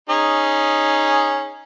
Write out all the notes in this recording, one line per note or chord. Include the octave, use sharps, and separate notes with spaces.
C#4 D#4 G#4